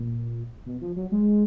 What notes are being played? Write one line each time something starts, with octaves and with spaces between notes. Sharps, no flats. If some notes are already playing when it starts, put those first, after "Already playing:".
Already playing: A#2
B2
F3
F#3
G#3